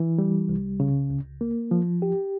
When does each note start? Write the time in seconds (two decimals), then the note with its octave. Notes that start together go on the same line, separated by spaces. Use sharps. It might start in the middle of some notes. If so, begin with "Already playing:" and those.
Already playing: E3
0.18 G3
0.49 C2
0.80 C#3
1.10 C#2
1.41 A#3
1.71 F3
2.02 G4